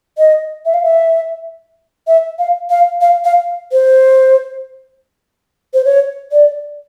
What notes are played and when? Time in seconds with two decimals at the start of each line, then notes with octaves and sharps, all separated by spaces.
0.18 D#5
0.66 E5
0.74 F5
0.84 E5
2.07 E5
2.39 F5
2.70 F5
3.01 F5
3.25 F5
3.72 C5
5.74 C5
5.85 C#5
6.32 D5